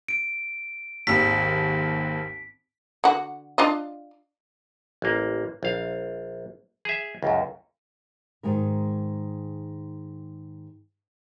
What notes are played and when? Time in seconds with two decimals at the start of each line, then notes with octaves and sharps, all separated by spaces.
0.08 D7
1.07 G#1 D#2 B6
3.04 D3 F#4
3.58 D4 F4 D#5
5.02 A1 A#3
5.63 A#1 F5
6.85 G#4 E5
7.23 C#2 F#2
8.43 G#2 D#3 G#3 A#4